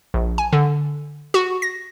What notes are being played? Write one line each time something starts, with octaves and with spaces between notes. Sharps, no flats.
A#1
G#5
D3
F#4
A#6